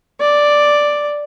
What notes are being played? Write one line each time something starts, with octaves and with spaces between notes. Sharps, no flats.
D5